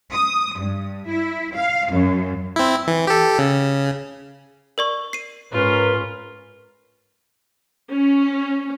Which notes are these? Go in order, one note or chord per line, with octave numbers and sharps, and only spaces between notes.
D#6
G2
E4
F5
F#2
C4 E4
E3
G4 A4
C#3
A#4 D5 C#6
C7 D#7
G#2 C#4 F4 A#4 B4
C#4